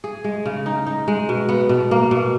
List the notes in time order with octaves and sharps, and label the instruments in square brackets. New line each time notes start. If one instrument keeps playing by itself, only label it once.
[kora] G#4
G#3
C#3
D#4
D#4
G#3
B2
B3
B2
A#3
B2